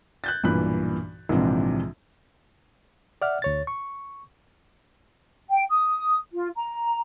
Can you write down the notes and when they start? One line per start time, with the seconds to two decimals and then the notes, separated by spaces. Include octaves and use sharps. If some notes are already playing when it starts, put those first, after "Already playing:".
0.24 F#6 G6 A6
0.44 B1 G2 A#2 E3 B5 F#6
1.29 A#1 G#2 C3 E3 C4 D4
3.22 D5 E5 F#5 F6
3.42 D2 C#5 A6
3.67 C#6
5.49 G5
5.69 D#6
6.33 F4
6.55 A#5